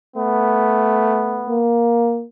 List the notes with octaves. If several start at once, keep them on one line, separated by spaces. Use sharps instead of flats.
A3 B3
A#3